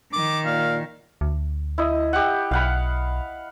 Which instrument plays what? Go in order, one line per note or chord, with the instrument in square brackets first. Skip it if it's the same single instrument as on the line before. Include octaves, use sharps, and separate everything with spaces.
[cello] D#3 [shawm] D6
[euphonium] A#2 [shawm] F5
[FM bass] D2
[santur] E4 D#5
G4 F#5
[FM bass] B1 [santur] F5 F#5 B5